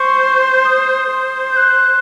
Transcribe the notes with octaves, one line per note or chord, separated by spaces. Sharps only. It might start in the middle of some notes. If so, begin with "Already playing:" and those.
Already playing: C5 C#6
D#6
C5
G6
F#6